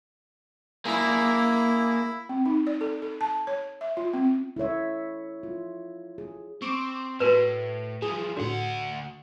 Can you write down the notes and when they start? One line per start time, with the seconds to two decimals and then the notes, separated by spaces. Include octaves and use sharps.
0.85 A#3 E4 G#4
2.29 C4
2.46 D#4
2.67 D5
2.81 A4
3.02 A4
3.21 A5
3.47 C#5
3.81 E5
3.97 F4
4.14 C4
4.56 E4 A4 C#5 E5
5.43 F4
6.18 G#4
6.62 C4 C#6 D6
7.20 A2 F#4 A#4 B4
8.02 E3 F3 G#4
8.37 D2 A2 D3 F#4 F#5